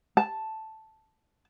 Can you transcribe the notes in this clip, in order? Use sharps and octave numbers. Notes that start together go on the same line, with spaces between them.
A5